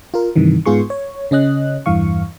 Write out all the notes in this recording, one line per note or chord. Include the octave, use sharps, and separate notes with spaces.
F4 A#4
G2 C3 D#3 E3
G#2 B3 F4 G#4 C6 C#6
C#5
C#3 C#4 D#5 F#6
E2 G2 E3 F5 C#6